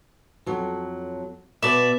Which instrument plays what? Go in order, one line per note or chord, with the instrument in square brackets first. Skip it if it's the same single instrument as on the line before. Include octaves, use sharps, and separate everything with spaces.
[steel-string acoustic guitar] F2 F#3
[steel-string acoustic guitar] B2 [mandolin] D5 E5